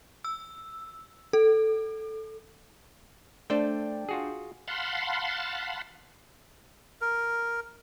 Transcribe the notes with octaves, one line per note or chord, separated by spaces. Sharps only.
E6
A4
A3 D4 C5 D5 G5
F4 F#4 G#4
F5 F#5 A5 B5 C6
A#4